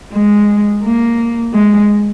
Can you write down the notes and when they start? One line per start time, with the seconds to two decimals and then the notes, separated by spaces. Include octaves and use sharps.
0.13 G#3
0.83 A#3
1.53 G#3